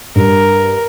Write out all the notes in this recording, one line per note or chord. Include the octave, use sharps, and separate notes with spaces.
G2 A#4